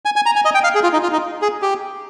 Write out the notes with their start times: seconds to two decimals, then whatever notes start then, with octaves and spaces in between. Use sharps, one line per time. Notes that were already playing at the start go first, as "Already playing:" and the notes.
0.05 G#5
0.16 G#5
0.26 A#5
0.36 G#5
0.45 D#5
0.54 G5
0.64 F5
0.75 G#4
0.83 F4
0.93 D#4
1.03 F4
1.13 D#4
1.42 G#4
1.62 G4